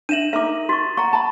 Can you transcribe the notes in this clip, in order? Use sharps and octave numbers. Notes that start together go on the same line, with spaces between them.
D4 E5 D#7 E7 F#7
D#4 A#4 E5 D6
F#4 C6 C#6 A6
F#5 A#5 C#6
A5 B5